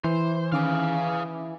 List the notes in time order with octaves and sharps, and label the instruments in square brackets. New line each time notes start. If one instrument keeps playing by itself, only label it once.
[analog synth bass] E3 [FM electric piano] E4 [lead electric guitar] C5
[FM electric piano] D#3 C#4 D6 [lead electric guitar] G#4 F5